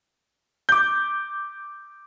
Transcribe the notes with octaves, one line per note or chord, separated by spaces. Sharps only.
D6 G6